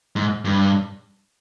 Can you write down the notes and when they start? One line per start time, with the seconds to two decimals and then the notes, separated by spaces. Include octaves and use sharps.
0.16 G#2
0.45 G2